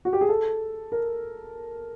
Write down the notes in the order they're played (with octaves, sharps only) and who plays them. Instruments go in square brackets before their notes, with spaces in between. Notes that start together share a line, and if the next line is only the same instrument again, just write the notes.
[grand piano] F#4
G4
G#4
A4
A#4